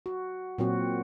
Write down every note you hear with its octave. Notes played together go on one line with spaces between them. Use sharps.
F#4
A#2 F#3 C4 F#4